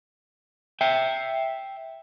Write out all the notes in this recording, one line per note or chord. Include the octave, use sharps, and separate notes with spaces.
E5 G5